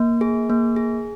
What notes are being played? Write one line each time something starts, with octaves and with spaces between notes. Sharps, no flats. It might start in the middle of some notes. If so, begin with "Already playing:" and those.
Already playing: A#3
G#4
A#3
G#4